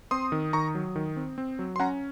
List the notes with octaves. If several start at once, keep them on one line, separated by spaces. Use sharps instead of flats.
C4 C6 D#6
D#3
D#3 A#5 C#6
F#3
D#3
C4
C4
F#3
C6
C#4 F#5 A#5